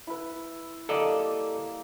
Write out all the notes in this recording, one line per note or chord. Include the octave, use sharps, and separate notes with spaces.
E4 B4
G3 A#3 A4 D5 D#5